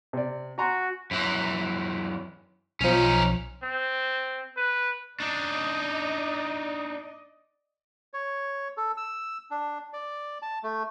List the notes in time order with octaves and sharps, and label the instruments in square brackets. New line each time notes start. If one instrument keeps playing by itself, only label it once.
[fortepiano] C3 D5
[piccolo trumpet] F#4 [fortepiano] G#5 A#5 C6
[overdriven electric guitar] F#2 E3
[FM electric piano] B1 F3 [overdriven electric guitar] C#4 D#4
[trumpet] C4
B4
[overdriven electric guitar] D4 D#4 [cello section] D5 D#5
[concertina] C#5
A4
E6
D4
D5
A5
A3